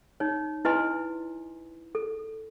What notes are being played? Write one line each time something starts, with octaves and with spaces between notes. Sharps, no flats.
D#4 C#5
E4 B4 D#5 G#5 C6
A4